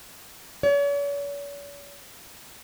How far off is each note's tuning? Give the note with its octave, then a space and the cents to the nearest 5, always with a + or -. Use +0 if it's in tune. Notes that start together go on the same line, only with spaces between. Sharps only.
C#5 +45